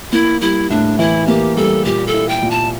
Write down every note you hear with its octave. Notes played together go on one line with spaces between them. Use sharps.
A#3 E4
G3 E4
A2 D4
E3 E4
A#3 G4
G3 A4
A#2 G4
A4
E4
G5
A#2
A5